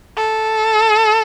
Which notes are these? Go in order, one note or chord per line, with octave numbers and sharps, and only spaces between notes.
A4